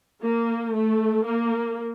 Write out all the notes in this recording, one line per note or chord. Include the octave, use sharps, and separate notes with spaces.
A#3
A3
A#3